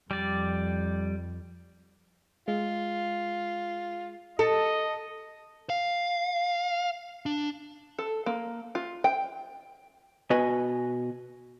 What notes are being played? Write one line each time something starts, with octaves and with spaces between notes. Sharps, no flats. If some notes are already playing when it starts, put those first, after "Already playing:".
F2 G3 D5
G#3 F4
A4 D#5
F5
D4
A4
A#3
F4
G5
B2 F#4 B4 D#5 G#5